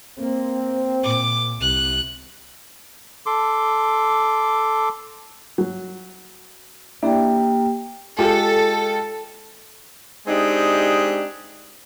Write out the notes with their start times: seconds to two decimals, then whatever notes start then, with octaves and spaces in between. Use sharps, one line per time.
0.18 A#3 C4
1.03 A#2 D6
1.60 C2 F#6
3.26 A4 C6 D6
5.58 F#3
7.03 A#3 D4 E4 G4 G5
8.18 G#3 F4 G4 A4
10.27 G#3 C4 D4 D#4 G4